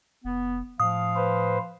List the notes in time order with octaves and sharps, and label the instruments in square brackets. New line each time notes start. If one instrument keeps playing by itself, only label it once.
[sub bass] F1 [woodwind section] B3
[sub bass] A2 [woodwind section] F3 F5 [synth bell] D#6
[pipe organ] B4 C5